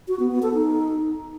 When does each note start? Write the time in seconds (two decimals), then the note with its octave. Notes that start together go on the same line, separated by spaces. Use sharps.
0.08 F#4
0.19 B3
0.31 B3
0.42 A4
0.54 D#4